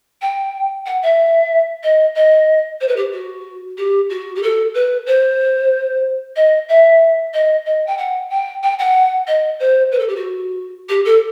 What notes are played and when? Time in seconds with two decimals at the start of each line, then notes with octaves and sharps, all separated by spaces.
0.21 G5
0.85 F#5
1.02 E5
1.83 D#5
2.15 D#5
2.80 C5
2.88 B4
2.96 G4
3.12 F#4
3.77 G4
4.09 F#4
4.35 G4
4.42 A4
4.74 B4
5.06 C5
6.36 D#5
6.68 E5
7.33 D#5
7.65 D#5
7.86 G5
7.97 F#5
8.30 G5
8.63 G5
8.79 F#5
9.27 D#5
9.59 C5
9.91 B4
9.99 A4
10.08 G4
10.16 F#4
10.89 G4
11.05 A4